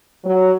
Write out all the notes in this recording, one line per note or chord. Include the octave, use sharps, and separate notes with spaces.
F#3